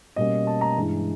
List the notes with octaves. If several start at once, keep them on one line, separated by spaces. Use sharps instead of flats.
B2 G3 A#3 C#4 D#5
A5
A#5
G2 E3 G#3